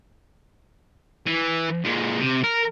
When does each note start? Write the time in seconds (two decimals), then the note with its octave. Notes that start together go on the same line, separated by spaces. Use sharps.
1.26 E3
1.84 A#2 G#3
2.20 C3
2.44 A#4